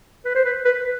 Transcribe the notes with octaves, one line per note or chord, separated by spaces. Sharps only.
B4
C5
B4
B4